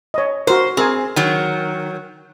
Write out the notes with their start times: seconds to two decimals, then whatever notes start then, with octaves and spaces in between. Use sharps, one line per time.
0.14 C#5 D#5
0.47 F#4 A#4 C5
0.77 C4 G#4 A#4 G#5
1.16 D#3 F#3